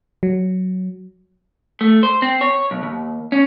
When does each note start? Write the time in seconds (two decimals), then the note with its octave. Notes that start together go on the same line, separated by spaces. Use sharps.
0.23 F#3
1.81 A3
2.03 C5
2.22 C4
2.41 C#5
2.71 B1
2.83 D#2
3.32 C#4